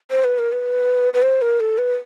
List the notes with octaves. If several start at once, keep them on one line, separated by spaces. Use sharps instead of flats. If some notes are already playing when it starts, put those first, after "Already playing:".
C5
B4
A#4
B4
B4
C5
A#4
A4
B4